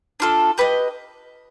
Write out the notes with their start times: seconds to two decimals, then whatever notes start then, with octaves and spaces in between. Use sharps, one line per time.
0.20 D4 F4 A4
0.58 G4 B4 D#5